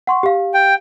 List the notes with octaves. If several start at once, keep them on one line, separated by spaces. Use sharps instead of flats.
F#5 C6 C#6
G4 F5
G5